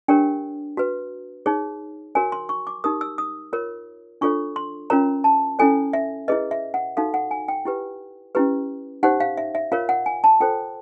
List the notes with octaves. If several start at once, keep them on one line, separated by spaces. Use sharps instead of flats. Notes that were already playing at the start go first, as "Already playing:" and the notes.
D4 G4 A#4 C#5 G5
F#4 B4
D#4 G#4 C#5
F#4 A#4 C#5 G#5
C6
C#6
D6
D#4 G4 A#4 D#6
E6
D#6
F4 A#4 C#5
D4 F4 A4 C#5 C#6
C6
C#4 F4 A#4 C#5 A#5
A5
C#4 E4 A4 C#5 G#5
E5
E4 G#4 B4 D#5
E5
F#5
D#4 F#4 A4 F5
F#5
G#5
G5
E4 G4 B4
C#4 E4 G4 B4
D#4 G4 C5 F#5
F5
E5
E5
F4 A#4 C#5 F5
F#5
G#5
A5
F4 A4 C5 G5